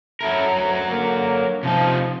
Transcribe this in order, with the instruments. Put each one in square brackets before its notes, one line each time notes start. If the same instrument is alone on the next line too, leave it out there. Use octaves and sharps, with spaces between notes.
[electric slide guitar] F#3 A#4 [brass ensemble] E4 A4
[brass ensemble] D2
D3 A#3
[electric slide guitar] C3 D#4 [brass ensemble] F3